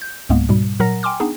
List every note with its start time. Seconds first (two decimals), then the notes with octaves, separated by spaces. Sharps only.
0.02 G6
0.30 C#2 G#2 G#3 A#3 B3
0.49 G#2 B2 G3
0.80 A#2 F#3 A#4 F#5 A#5 A#6
1.03 G5 G#5 C6 D6 F6
1.20 B3 D4 D#4 G#4